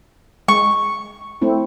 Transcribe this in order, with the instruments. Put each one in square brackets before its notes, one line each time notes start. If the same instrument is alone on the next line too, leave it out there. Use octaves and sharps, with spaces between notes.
[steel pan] G#3 [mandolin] C#6
[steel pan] A3 C4 E4